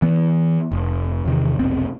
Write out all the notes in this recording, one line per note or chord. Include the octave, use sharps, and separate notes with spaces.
E3 B3
F1
E2 C3 D#3
F1 B1 B3 C4